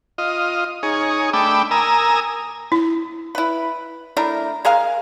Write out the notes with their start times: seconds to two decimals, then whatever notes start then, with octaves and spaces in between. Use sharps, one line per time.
0.18 F4 D#5
0.83 D#4 G#4 C#5
1.33 A3 D4 G5 B5 D6 E6
1.71 A#4 G#5 A#5 D#6 E6
2.72 E4
3.35 E4 B4
4.17 A3 D4 E4 A#4
4.65 G#3 G#4 A#4 F5